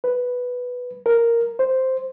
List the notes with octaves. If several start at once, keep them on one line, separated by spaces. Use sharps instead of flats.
B4
A#4
C5